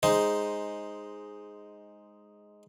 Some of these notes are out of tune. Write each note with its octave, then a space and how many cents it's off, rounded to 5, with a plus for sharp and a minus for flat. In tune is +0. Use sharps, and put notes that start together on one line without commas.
G#3 +0 D#4 +0 C5 +0